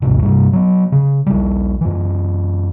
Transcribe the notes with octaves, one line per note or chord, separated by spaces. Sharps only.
A#1 D#2 G#2 C3
G2 C3 G3
F#3 B3
C#3
A#1 G3
F#2 E3